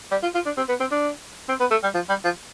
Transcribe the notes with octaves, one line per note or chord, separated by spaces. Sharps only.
G3
F4
F4
D4
C4
B3
C4
D4
C4
B3
A3
G3
F3
G3
F3